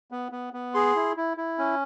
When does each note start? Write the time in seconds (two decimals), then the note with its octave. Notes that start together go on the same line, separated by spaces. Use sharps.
0.12 B3
0.32 B3
0.53 B3
0.74 G#4 C6
0.96 E4
1.17 E4
1.37 E4
1.58 C#4